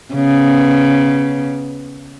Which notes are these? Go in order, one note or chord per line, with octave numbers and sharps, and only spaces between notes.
C#3 B3